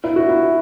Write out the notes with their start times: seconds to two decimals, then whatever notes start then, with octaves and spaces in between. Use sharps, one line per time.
0.04 E4
0.16 F#4
0.29 E4